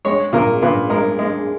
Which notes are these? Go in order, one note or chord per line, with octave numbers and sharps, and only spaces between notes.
G#3 C#5
A#2 A#4
A#2 B4
G#3 A#4
G#3